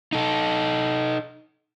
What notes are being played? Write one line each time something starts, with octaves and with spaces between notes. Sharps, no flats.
D#4 A4